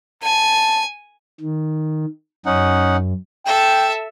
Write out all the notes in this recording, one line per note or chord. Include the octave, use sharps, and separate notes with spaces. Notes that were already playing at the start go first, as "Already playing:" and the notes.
G#5 A5
D#3
F#2 C#4 D#4 F#5
A4 E5 G5